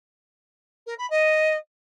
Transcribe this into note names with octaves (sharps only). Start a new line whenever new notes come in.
A#4
B5
D#5